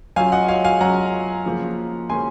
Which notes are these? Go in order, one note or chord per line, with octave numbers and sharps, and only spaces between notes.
F#3 C#4 F4 F5 G#5
D#5 F#5
C#5 F5
F5 G#5
F#3 C#4 F4 F#5 A#5
C#3 F3 A#3 C#4
C#3 F3 A#3 C#4 G#5 C6